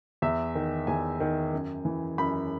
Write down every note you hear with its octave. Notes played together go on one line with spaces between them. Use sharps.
E2 E5
D#3
E2 G#5
D#3
F#2
E3
F#2 B5